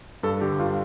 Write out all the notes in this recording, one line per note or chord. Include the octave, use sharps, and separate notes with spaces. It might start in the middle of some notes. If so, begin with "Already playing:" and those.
G2 A4
D3 G4
G2 F4